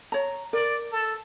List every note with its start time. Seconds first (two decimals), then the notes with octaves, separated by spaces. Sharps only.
0.12 C#5 A#5
0.53 A#4 D5
0.92 A4